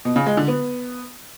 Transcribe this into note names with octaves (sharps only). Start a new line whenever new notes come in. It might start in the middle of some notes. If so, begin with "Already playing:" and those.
B2
C#3
G#3
D3
B3